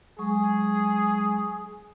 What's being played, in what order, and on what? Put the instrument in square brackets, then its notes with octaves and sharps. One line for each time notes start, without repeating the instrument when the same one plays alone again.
[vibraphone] F#3 G#3 C#6 [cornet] G#4